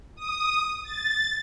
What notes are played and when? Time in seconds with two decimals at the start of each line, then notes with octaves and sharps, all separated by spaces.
0.16 D#6
0.83 A6